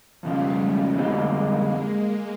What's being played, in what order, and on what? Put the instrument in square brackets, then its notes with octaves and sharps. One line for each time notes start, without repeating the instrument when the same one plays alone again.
[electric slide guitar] F2 C#3 F3 [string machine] G3 A3
[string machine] F#3 G#3
[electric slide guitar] F2 D3 G3 C4 D#4 [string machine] G#3 A#3